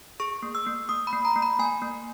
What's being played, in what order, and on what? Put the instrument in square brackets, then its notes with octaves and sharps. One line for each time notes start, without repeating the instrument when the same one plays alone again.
[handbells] G#4 C#6
A#3
E6
A#3
A#3 D#6
B5
A#3
A#5
A#3
B5
A#3 G#5
A#3